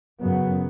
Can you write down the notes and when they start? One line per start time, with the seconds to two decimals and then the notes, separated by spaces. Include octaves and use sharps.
0.20 F#2 C#3 F#3 B3